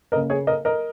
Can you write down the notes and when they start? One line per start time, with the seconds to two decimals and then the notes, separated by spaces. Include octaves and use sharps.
0.12 A#3 A#4 D#5
0.16 C#3
0.30 G#4 C#5
0.47 A#4 D#5
0.65 A#4 D#5